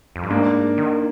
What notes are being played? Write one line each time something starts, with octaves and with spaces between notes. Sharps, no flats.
F2
G2
G#2 A#3 D4
D#3